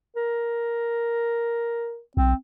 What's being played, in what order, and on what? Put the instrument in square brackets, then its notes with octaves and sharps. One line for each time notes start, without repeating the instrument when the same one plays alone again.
[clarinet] A#4
[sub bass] B1 [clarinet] C4